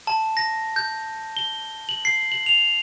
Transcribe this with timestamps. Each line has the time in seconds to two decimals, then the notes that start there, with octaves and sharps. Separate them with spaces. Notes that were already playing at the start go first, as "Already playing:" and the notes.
0.07 A5
0.37 A#6
0.76 G6
1.37 G7
1.89 F#7
2.05 C7
2.32 F#7
2.46 F7